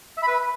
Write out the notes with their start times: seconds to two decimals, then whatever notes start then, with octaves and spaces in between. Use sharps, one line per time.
0.18 E5
0.23 B5
0.28 B4